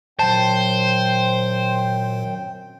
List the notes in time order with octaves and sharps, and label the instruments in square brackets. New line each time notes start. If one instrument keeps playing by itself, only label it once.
[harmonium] F#2 C4 G5 [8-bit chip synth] A#2 D#3 F#3 [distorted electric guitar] C5 [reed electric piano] A5